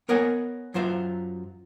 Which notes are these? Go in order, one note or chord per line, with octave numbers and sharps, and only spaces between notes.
B3 A#4 C#5 D#5 F#5 G#5
F#2 F#3 F4 C5 E5